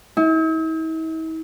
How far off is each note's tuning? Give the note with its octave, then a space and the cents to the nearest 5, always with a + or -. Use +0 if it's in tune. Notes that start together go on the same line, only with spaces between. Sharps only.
E4 -45